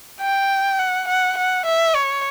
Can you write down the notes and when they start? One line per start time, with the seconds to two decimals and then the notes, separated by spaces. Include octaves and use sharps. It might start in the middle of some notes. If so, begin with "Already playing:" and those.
0.21 G5
0.79 F#5
1.08 F#5
1.37 F#5
1.66 E5
1.95 C#5